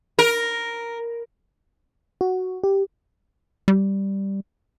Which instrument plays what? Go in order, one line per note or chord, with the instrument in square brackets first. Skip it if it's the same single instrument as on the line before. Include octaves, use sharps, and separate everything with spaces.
[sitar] A#4
[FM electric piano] F#4
G4
[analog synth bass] G3